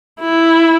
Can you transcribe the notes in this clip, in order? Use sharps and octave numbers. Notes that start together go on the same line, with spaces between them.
E4